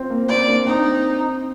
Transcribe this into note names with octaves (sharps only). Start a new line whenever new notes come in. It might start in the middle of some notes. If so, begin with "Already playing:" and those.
Already playing: C4 F4
A#3
C4 D5
A#3 D4
C4 D#4